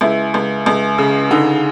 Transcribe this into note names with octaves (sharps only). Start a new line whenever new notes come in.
C#2 E4
C#2
C#2
C#3
D3 D#4